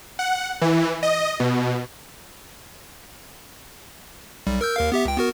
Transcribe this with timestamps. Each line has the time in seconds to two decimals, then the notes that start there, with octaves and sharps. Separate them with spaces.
0.19 F#5
0.62 E3
1.03 D#5
1.40 B2
4.47 B1 G3
4.61 A#4 E6 G6
4.76 D#2 A#4 F5
4.92 B3 G4 E5
5.05 C#2 G5
5.17 B3 F#4 A#4